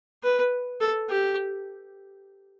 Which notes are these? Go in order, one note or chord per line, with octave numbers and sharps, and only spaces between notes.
B4
A4
G4